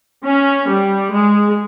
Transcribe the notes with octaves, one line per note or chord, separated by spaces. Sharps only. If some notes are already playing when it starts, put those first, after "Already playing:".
C#4
G3
G#3